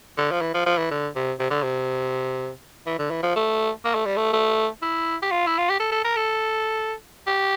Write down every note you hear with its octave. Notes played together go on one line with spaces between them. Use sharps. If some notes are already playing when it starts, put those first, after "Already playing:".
D3
F3
E3
F3
F3
E3
D3
C3
C3
D3
C3
E3
D3
E3
F3
A3
A#3
A3
G3
A3
A3
E4
G4
F4
E4
F4
G4
A4
A4
A#4
A4
G4